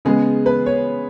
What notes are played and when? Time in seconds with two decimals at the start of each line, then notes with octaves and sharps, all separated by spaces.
0.05 C#3 G#3 B3 G#4
0.46 B4
0.66 C#5